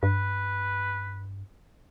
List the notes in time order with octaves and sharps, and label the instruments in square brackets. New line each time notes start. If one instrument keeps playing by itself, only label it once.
[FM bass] G2 [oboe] B4